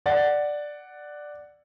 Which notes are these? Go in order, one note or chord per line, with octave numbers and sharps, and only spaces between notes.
D5 F#5 A6